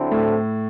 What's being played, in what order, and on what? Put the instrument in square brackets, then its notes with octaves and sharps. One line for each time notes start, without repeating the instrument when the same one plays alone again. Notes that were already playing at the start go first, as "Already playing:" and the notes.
Already playing: [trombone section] D3 F#3 C4 E4 A4
[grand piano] A2